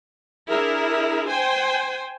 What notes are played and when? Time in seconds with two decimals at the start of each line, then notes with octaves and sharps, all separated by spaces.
0.48 D4 E4 G#4 A#4
1.29 C5 G5 G#5